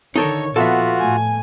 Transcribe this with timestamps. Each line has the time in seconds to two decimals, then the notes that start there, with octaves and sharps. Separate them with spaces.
0.16 D3 D#3 D#4 A4 A#4 C#5
0.56 A#2 F3 B3 F4 F#4 A4 E5
0.98 A2 A3 G#5